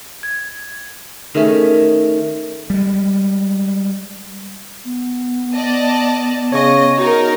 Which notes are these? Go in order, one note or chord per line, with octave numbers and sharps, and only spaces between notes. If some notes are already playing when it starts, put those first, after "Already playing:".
G#6
D#3 A3 C#4 G#4 A4 E5
G3 G#3
B3
D5 D#5 A5
C#3 C#5 D#5 C#6
D#4 F#4 A#4